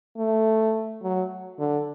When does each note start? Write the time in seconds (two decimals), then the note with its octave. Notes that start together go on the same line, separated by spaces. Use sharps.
0.18 A3
1.03 F#3
1.59 D3